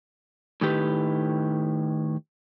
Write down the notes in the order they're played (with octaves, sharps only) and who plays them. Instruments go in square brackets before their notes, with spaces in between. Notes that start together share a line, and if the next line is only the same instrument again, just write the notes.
[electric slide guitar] A2 D#3 G4 B4